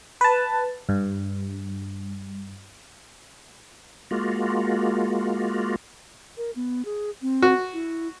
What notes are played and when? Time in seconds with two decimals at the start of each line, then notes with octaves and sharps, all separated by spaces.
0.21 B4 A5
0.89 G2
4.11 G#3 A#3 F4 F#4
6.37 A#4
6.56 B3
6.85 G#4
7.22 C4
7.42 F#4
7.73 E4